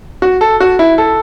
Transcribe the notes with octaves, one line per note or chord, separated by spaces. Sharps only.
F#4
A4
F#4
E4
A4